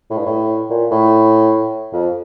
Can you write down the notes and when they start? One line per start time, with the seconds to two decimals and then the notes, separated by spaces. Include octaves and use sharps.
0.10 A2
0.18 G2
0.25 A2
0.70 A#2
0.91 A2
1.93 F2